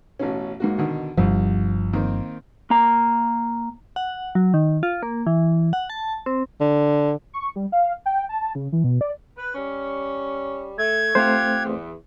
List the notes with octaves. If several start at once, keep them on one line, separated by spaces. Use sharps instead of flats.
A1 B2 C#4
G#2 A#3 F#4
B2 D3 D#3
G1 C2 G2 F3
D#3 A#3 C4
A#3 A#5
F#5
F#3
D#3
F4
A#3
E3
F#5
A5
C4
D3
C#6
G3
F5
G5
A5
C#3
E3
B2
D5
B4
G3 C#4
A3 G#6
A3 C4 F4 G4 C5 F#5
E2